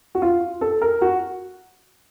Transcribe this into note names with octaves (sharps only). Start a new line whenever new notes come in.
F#4
F4
A4
A#4
F#4